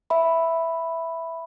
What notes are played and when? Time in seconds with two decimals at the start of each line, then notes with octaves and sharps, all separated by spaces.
0.10 E5 B5